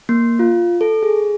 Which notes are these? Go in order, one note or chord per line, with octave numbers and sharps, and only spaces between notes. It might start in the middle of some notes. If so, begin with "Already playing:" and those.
A#3
F4
A4
G#4